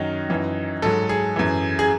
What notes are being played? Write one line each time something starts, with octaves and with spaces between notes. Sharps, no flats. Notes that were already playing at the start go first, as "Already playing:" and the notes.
Already playing: F#2 D#3 F#3 D#4
F#2 E3
G#2 F#3 A4
G#4
F#2 E3
G#4